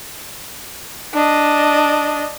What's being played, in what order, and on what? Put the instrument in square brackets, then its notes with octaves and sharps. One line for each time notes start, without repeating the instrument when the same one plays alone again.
[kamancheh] D4 D#5